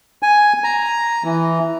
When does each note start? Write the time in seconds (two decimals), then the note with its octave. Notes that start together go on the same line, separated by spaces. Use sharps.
0.23 G#5
0.64 A#5
1.24 E3